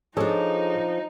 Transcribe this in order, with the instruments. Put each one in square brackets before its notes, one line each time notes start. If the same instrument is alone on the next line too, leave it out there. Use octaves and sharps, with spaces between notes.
[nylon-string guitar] F3 D4 [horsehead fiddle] D#4 [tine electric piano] G#4 A4 C#5